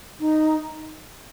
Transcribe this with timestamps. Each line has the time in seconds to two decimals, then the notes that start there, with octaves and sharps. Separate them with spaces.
0.20 D#4